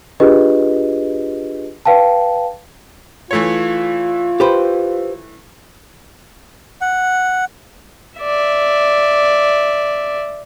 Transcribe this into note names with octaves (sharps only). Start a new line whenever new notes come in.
D4 F4 G4 G#4 B4 D#5
B4 F5 G5 A5
E3 A3 F4 C#5
G4 B4 C5
F#5
D5 E5